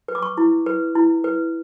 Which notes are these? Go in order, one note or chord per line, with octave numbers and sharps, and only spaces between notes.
B4
D6
C#6
E4
B4
E4
B4